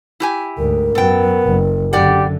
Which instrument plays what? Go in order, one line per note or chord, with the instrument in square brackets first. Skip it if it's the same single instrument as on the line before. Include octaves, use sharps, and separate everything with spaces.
[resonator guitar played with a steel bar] E4 G4 G#5
[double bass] D2 G#2 [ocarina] A#4
[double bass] F#2 F#3 [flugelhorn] B3 [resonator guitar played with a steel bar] A4 G5
[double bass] F#1
[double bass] F#2 D3 [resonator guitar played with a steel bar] A2 D5 F#5 [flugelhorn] G4